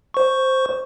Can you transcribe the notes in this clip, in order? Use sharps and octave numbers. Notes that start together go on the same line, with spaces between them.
C5 C#6